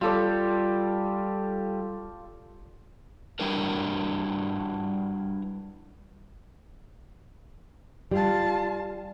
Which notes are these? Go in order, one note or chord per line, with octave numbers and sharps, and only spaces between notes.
G3 F4 A4 D5
G3 D4 E4 F#4 A#4 B4
G3 F4 A5